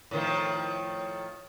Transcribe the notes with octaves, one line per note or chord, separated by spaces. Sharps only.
A2 D#3 F3